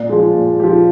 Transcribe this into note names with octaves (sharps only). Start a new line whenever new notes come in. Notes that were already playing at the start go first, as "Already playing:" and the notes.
Already playing: A#2 D5
F3 G#3
A#2
F3 G#3 G4